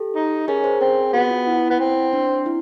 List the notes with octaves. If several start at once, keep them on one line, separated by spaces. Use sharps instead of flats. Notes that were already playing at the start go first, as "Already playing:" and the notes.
Already playing: G4 A4
D#4
C#4 G#4 A#4
A#4 C5
C4 G#4
B3 F#4
F4
E4
B3
C4
D4
E4